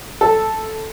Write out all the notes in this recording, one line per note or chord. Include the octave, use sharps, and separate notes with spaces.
A4